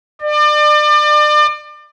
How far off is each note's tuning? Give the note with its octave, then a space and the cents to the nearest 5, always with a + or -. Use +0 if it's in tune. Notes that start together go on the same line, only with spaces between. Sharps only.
D5 +35